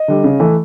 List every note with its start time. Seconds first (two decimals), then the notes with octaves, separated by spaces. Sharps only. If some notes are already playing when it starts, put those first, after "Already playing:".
Already playing: D#5
0.08 D3 G3
0.24 C#3
0.40 E3 A3